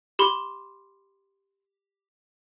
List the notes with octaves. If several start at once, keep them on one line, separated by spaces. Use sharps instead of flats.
G4 B5 C6